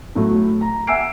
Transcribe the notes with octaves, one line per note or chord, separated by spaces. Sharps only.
A2 F#3 A3
A#5
E5 F#5 G#5 E6 C7 D7